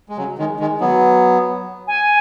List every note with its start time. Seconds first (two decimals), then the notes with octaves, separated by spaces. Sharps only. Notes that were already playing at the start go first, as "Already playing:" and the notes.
0.09 G#3
0.17 C#3 F#3
0.38 D#3 G#3
0.60 D#3 G#3
0.80 F#3 B3
1.87 G#5